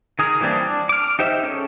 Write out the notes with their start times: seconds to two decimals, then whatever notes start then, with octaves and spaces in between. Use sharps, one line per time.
0.19 D#3 G#4 A#4
0.41 E3 G3 A#3 C4 D4
0.61 D4
0.89 D6 F6
1.19 D#4 G4 C5 D#5 E5
1.43 C#4 G#4 A4 C#5